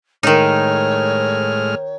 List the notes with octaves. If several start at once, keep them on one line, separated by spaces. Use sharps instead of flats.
A2 D#3 G#3 D#4 C#5 F6